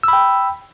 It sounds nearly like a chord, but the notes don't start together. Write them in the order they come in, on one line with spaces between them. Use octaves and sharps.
E6 B5 G5